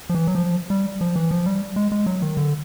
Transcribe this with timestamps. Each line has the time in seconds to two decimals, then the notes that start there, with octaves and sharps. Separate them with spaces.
0.10 F3
0.15 E3
0.27 F#3
0.35 F3
0.70 G3
1.01 F3
1.16 E3
1.31 F3
1.46 G3
1.76 G#3
1.92 G#3
2.06 F#3
2.22 D#3
2.37 D3